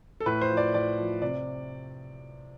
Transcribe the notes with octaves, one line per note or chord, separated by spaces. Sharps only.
A4
A2 B4
C5
F3
D5
A2 D5
F3
C3 D5